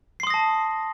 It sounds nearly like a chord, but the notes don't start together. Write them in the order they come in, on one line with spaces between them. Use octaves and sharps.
C7 C6 D#6 A#6 A5